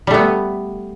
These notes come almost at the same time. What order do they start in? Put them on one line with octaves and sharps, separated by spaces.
G3 A3 B3